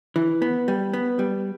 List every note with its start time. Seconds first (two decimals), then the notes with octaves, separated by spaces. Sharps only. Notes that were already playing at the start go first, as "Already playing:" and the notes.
0.16 E3
0.42 B3
0.68 G3
0.93 B3
1.19 G3